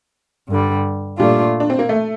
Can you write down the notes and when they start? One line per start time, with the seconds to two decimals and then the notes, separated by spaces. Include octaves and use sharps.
0.49 G2 D3 G3
1.19 A#2 G3 A3 D4 F4
1.60 D4
1.70 C4
1.79 A#3
1.89 A3